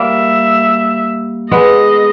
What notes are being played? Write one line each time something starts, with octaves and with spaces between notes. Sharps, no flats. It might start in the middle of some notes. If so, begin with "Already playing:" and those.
Already playing: G3 A#3 E5
G#3 B3 D#5